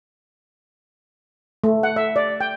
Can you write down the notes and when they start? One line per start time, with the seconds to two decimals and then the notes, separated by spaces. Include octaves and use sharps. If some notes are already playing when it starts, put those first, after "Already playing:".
1.64 A3
1.83 F#5
1.96 E5
2.16 D5
2.41 G5